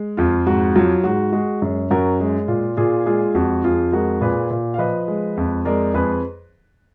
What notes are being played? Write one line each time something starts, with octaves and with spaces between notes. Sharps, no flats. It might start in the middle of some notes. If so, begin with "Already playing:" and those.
Already playing: G#3
F2 F4
G#2 F#4
F#3 F4
G#2 F#4
G#3 F#4
F#2
F#2 F#4 A#4
G#3
A#2 F4
A#2 F4 G#4
G#3 F4 G#4
F2 F#4
F2 F4 G#4
G#3 F#4 A#4
A#2 G#4 B4
A#2
F5
F3 B4 D#5
G#3
F2
G#3 A#4 D5
F2 G#4 B4